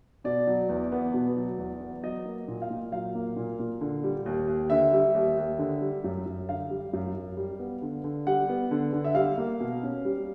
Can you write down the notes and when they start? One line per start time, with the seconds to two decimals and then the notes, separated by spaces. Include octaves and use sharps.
0.24 B2 D5
0.47 F#3
0.69 E2
0.92 B3
1.14 B2
1.37 F#3
1.58 E2
1.80 B3
2.03 F#3 D#5
2.25 A#3
2.48 A#2
2.62 F5
2.70 A#2
2.92 F#3 F5
3.15 A#3
3.36 A#2
3.59 A#2
3.81 D3
4.03 G3
4.26 D#2
4.48 D#2
4.70 D3 E5
4.93 G3
5.15 D#2
5.37 D#2
5.59 D3
5.81 G3
6.04 F#2
6.26 F#2
6.48 D3 F5
6.70 G3
6.93 F#2
7.15 F#2
7.37 G3
7.59 B3
7.82 D3
8.04 D3
8.27 G3 F#5
8.49 B3
8.71 D3
8.93 D3
9.04 E5
9.15 G3 F5
9.38 A#3
9.60 B2
9.83 C#4
10.05 G3